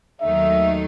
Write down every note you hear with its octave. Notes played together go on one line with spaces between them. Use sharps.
D#2 D#3 F#3 A3 D#4 E5